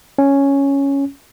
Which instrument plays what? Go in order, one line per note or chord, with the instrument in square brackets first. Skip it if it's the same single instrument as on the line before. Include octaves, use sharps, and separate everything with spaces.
[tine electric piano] C#4